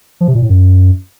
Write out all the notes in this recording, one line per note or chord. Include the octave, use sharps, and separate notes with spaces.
F3
C3
A#2
A2
F#2